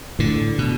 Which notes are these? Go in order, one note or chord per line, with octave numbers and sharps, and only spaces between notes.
A2 D3
B2